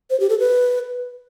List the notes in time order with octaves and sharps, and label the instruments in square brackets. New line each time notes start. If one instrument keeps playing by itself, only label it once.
[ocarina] C5
G4
A4
B4